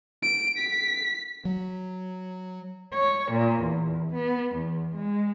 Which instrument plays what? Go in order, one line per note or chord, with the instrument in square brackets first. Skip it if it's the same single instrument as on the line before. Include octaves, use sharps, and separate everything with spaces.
[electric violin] D7
B6
[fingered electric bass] F#3
[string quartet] C#5
A#2
E2
B3
E2
G#3